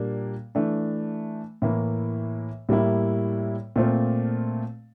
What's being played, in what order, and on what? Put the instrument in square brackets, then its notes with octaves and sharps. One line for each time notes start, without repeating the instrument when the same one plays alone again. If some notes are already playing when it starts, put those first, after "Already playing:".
Already playing: [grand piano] A#2 G3 A#3 D4
E3 A3 D4
A2 E3 A#3
A2 G3 A#3 E4
A#2 A3 C4 F4